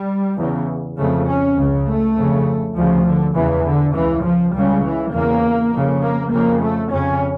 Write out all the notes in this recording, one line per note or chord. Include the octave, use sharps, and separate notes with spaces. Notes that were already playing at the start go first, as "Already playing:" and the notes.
Already playing: G3
E2 C#3
F2 C#3 A3
C#4
C#2 C#3
A3
F2 C#3
D2 C#3 F3
D3
E2 C#3 E3
D3
C#2 C#3 E3
F3
C#2 C#3 G3
E3
E2 C#3 A#3
F2 C#3
A#3
F2 C#3 A#3
A3
F2 C#3 C#4